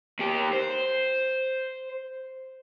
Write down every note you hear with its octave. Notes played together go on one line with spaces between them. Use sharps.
D#2 G4
C5